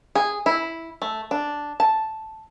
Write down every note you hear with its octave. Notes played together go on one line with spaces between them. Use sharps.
G#4
E4
A3
D4
A5